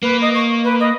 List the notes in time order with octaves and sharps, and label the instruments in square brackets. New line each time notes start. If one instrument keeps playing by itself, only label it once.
[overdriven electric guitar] A#3 [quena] B4
[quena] D#5
C#6
B4
D#5